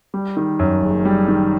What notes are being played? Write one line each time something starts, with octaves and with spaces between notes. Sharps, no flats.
G3
D#3
F#2
F#1
G3
D#3